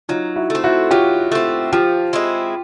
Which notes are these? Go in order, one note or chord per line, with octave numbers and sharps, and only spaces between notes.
F#3 D#4 F4
E4 F#4
A3 C4
E4 F#4
F#3 F4 G4
A3 C4
F3 F4 G4
G#3 C4 E4